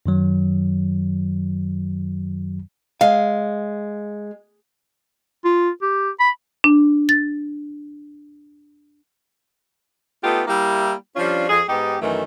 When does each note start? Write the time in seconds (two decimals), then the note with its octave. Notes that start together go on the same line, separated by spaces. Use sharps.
0.06 F#2 D#3 F#3
3.01 G#3 F5
5.45 F4
5.82 G4
6.20 B5
6.64 D4
7.09 A6
10.23 A3 B3 D#4 F4 G4
10.48 G3 A#3 E4
11.16 F3 G3 C#4 D4 F4
11.49 F2 G#4
11.68 G#2 B3 D#4 G4
12.00 F#2 D#3 E3 A3